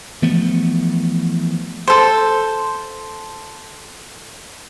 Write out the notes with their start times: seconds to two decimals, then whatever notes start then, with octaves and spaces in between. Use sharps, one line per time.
0.22 E3 F3 A3 B3
1.87 A4 C5